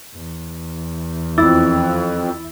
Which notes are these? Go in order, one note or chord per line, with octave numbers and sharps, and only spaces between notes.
E2
F2 E4 D6 E6 A6